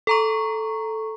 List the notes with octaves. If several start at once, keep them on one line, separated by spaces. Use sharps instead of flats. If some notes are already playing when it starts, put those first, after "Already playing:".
A4 A#5 C#6